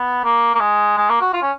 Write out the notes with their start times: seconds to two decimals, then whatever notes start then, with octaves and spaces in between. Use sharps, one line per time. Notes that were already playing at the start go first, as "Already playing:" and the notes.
Already playing: B3
0.24 A#3
0.55 A#3
0.60 G#3
0.97 G#3
1.09 A#3
1.21 F#4
1.33 F4
1.42 C#4